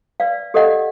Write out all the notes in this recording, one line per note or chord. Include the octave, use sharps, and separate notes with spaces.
B4 D5 F5
G4 A4 D5 D#5 F5 F#5